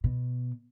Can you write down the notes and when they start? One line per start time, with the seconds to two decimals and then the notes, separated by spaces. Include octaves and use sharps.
0.04 B2